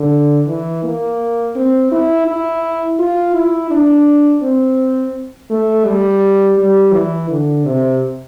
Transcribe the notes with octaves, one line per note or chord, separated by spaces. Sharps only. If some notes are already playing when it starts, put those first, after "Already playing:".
Already playing: D3
E3
A#3
C4
E4
E4
F4
E4
D4
C4
A3
G3
G3
E3
D3
C3